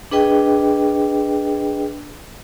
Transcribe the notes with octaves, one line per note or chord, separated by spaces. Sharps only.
D4 G#4 B4 D#5 G5